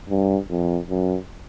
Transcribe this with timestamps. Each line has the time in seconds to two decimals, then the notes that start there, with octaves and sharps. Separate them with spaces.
0.10 G2
0.50 F2
0.89 F#2